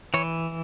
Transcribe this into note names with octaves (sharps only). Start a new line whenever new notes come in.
E3 C#5